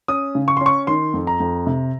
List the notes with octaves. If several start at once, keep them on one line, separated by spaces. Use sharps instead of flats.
C#4 D#6
C#3
C#6
C6
C#4
C#6
D#3 C6
F2
A#5
F2
C3